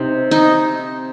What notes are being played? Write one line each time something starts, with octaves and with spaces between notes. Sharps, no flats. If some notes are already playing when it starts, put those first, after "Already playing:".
Already playing: C3 D#4
D#4